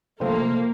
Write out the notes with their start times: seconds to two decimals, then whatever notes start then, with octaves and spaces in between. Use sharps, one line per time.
0.20 C3 F3 A3 A#3 C4